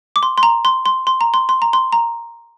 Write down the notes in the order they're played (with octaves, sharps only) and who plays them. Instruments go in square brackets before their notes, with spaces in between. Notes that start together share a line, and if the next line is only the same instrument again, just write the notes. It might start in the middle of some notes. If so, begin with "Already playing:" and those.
[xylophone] D6
C6
C6
A#5
C6
C6
C6
A#5
C6
C6
A#5
C6
A#5